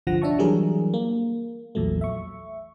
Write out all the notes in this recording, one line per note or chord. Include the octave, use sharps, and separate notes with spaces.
G1 C2 D3 F3 F#5 A#6
D4 C#5 E5 A5 C#6
E3 F#3 G3 D4 G#4 A#4
A#3
A#1 E2 A#2 F#3 A3
E5 C#6